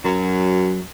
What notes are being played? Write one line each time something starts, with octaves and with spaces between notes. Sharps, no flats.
F#2 F#3